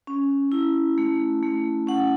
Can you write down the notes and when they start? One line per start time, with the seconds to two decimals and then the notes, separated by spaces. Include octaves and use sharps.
0.07 C#4
0.52 E4
0.98 A3
1.43 A3
1.87 C#4 F#5